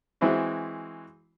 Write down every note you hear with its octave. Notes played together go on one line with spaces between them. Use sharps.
E3 G#3 C4 E4 F#4